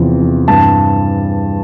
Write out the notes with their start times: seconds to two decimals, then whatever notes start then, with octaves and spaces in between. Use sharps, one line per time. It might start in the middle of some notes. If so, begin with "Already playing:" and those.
Already playing: E2 C3 F3
0.21 E3
0.48 G2 A5